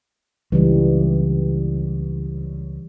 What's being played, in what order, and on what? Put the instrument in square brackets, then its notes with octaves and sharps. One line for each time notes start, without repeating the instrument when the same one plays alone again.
[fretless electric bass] C#2 [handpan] E3 G3